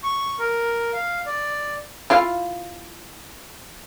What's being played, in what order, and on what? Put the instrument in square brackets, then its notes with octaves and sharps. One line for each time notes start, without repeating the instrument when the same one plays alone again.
[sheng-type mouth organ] C#6
A#4
F5
D5
[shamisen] E4 F4 F5